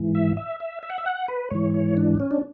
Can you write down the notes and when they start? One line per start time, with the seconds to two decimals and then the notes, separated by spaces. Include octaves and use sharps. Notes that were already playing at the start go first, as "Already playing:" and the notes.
Already playing: G#2 E3
0.15 E5
0.37 E5
0.60 E5
0.83 E5
0.90 F#5
0.98 E5
1.06 F#5
1.28 B4
1.50 G#2 E3 C#5
1.74 C#5
1.97 D4
2.20 C#4
2.31 D4